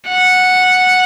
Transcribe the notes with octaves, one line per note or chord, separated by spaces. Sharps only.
F#5